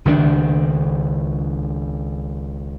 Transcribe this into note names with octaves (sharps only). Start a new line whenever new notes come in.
C#2 D#3 G3 D4